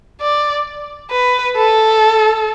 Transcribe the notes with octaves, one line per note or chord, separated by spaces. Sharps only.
D5
B4
A4